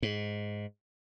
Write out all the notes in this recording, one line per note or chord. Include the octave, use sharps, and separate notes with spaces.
G#2